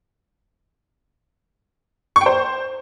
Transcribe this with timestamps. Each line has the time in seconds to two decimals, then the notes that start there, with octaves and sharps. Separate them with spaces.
2.16 C#6
2.21 G5
2.26 C5